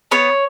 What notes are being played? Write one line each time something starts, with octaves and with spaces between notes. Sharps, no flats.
B3 C#5